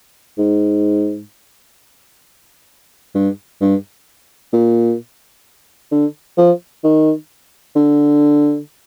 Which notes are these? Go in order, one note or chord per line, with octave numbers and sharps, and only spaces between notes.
G#2
G2
G2
A#2
D3
F3
D#3
D3